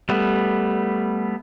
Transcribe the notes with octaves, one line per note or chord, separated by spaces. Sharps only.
G3 A3 B3